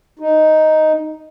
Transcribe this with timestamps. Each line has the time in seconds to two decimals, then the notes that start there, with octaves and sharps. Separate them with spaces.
0.19 D#4